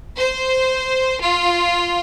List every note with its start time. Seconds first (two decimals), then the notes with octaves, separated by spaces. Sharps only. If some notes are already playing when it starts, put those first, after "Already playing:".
0.17 C5
1.20 F4